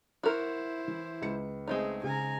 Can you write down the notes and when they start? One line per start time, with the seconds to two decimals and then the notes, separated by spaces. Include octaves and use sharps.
0.23 E4 F#4 A#4 C5
0.88 E3
1.22 C#2 B4 C#7
1.68 G#3 A3 C4 D#4 G#4
2.03 C#3 G#5 A#5